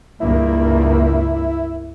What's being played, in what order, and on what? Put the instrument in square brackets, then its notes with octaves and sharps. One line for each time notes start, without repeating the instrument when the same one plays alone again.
[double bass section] C#2 G2 A#3 [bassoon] E4